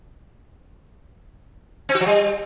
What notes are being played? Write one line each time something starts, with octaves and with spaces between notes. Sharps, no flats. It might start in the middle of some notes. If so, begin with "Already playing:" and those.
C4
F#4
F3
G3